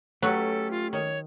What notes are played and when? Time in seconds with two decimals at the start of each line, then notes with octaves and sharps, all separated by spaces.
0.22 F#3 A3 C#4 G4 A4 B4
0.71 F4
0.93 D#3 C#5